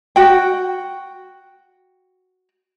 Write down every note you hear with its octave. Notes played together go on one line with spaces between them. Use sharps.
F#4 G5